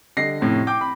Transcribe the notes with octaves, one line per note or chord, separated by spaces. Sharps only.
D3 G3 D#5 A#6 C7
F2 A2 C3 C#4
G5 D6 G6
B5